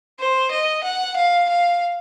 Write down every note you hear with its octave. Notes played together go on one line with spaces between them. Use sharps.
C5
D#5
F#5
F5
F5